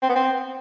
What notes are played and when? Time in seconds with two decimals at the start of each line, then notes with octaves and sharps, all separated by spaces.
0.02 C4
0.09 B3
0.16 C4